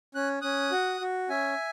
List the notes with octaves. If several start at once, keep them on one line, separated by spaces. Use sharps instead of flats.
C#4 F#6
C#4 D#6 F#6
F#4
F#4
C#4 E5 G#5